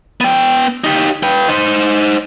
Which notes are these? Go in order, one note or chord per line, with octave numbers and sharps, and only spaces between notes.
B3 G5
D#4 G4
B4 G5
D#4 C5